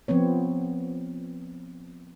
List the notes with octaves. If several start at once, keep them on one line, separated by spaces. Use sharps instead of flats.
F3 B3 C4 C#5